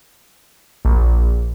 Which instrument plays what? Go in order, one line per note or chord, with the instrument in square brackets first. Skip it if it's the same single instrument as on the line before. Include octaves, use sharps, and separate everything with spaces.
[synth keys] A#1